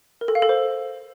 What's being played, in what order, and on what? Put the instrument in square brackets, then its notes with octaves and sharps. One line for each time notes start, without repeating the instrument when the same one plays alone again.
[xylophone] A#4
A4
F5
A4
C5